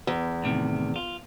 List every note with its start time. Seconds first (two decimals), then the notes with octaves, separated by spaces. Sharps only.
0.07 E2
0.44 A2 C3 D#3
0.96 F4